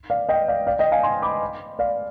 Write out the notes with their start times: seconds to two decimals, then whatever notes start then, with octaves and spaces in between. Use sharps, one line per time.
0.10 D5 F5
0.29 D#5 G5
0.48 D5 F5
0.67 D5 F5
0.79 D#5 G5
0.92 F5 G#5
1.03 G#5 C6
1.22 B5 D6
1.79 D5 F5